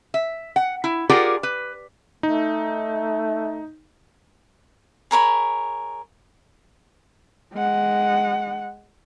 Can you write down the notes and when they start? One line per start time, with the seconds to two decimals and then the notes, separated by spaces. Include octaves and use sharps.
0.14 E5
0.56 F#5
0.84 E4
1.09 F4 G4 G#4 A#4 D5 F#5
1.43 B4
2.23 A3 D#4
5.11 G#4 A#4 C#5 B5
7.53 G#3 F#5